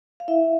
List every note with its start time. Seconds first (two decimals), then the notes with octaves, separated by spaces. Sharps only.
0.20 F5
0.28 E4 E5